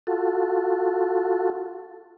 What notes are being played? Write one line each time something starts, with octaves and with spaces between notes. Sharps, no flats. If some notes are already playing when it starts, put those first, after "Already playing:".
F4 F#4 A4